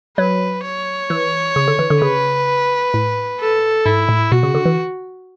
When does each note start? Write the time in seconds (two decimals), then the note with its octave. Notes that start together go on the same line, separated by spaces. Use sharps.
0.18 F#3 B4
0.65 C#5
1.10 E3
1.56 C#3
1.68 D3
1.79 E3
1.90 D3
2.02 C#3 B4
2.94 A2
3.40 A4
3.86 G#2 E4
4.09 A2
4.32 B2 F#4
4.43 C#3
4.55 D3
4.65 E3